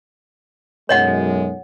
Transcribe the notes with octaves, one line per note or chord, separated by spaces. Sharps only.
B1 F#2 G#3 C#5 D#5 F#5